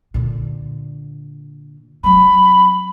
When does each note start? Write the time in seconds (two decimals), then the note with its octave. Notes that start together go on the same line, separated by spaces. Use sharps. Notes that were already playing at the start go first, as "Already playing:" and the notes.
0.14 A#2 D3
2.03 F#3 C4 B5